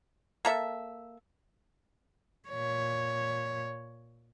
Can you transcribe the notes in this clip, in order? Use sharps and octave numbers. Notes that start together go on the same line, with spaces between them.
A#3 A4 E5
A#2 C#5